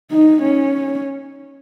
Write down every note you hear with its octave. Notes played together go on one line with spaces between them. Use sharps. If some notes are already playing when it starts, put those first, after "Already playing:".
D#4
C#4